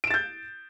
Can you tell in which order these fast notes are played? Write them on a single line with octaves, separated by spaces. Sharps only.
D7 E7 A6 G6